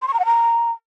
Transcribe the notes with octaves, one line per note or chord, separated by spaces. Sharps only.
C6
C#6
A#5
F#5
A#5